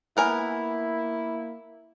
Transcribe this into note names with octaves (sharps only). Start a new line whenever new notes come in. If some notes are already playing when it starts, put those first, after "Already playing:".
A#3 B3 E4 A#4 G#5